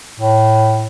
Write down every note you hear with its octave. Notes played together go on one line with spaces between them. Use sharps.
A2